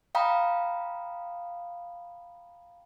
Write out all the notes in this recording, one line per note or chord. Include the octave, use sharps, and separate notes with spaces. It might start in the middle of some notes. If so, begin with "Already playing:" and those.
F5 G5 A#5 B5 D#6